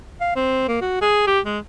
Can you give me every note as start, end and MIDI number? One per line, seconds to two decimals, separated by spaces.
0.21 0.32 77
0.36 0.64 60
0.68 0.81 58
0.81 0.99 66
1.01 1.25 68
1.27 1.40 67
1.45 1.58 56